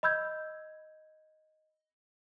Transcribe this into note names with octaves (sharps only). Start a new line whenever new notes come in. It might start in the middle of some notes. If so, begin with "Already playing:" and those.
D#5 B5 E6 G6 G#6